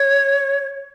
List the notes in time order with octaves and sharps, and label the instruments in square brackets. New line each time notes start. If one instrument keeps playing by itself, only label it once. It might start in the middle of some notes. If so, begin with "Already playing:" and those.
Already playing: [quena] C#5